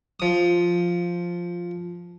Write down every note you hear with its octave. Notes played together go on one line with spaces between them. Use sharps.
F3 D#6